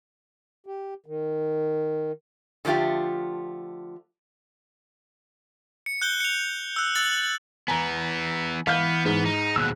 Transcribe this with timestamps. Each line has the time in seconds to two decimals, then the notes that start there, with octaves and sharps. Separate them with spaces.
0.66 G4
1.06 D#3
2.65 D3 F3 A3 F4 G4
5.86 C#7
6.02 F#6 G6 G7
6.20 C#7 F7
6.76 E6 F#6
6.95 E6 F#6 A6 F#7
7.68 E3 B3 G#5 A#5
8.67 E3 B3 F5 F6 G6
9.06 G#2 B3
9.26 D#4
9.56 D#2 B2 E6 F#6